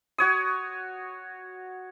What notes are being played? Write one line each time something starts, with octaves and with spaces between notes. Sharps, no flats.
F#4 C#5 D#6